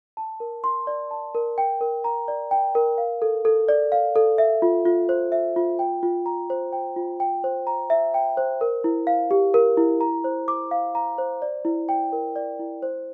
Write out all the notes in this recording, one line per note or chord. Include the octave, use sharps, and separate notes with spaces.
A5
A#4
C6
D5
A5
A#4
G5
A#4
A#5
D5
G5
A#4
F5
A4
A4
D5
F5
A4
E5
F4
F4
C5
E5
F4
G5
F4
A#5
C5
G5
F4
G5
C5
A#5
E5
G5
C5
A#4
E4
F5
G4
A#4
E4
A#5
C5
D6
F5
A#5
C5
D5
E4
G5
A#4
D5
E4
C5